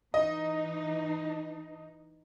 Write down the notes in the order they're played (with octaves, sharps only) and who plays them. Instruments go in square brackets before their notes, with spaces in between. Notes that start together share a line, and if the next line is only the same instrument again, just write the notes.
[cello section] E3 D#4 [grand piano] D#5